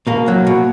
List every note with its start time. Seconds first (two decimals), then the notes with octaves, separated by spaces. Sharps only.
0.07 B2 A#3
0.28 F#3
0.47 B2